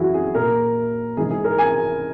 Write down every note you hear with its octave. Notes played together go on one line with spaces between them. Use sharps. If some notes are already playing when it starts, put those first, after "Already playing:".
Already playing: F#2 E3 E4 F#4 G#4
G#4
A#2 A#4
G#2 E3 G#4
G#4
A#4
G#5